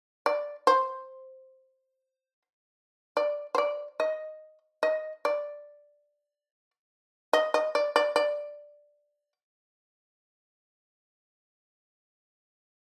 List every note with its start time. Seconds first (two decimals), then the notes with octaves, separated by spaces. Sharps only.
0.26 D5
0.67 C5
3.17 D5
3.55 C5
3.58 D5
4.00 D#5
4.83 D#5
5.25 D5
7.33 D#5
7.54 D#5
7.75 D5
7.96 D5
8.16 D5